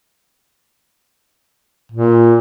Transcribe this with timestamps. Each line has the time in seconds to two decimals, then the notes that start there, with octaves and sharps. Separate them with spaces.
1.92 A#2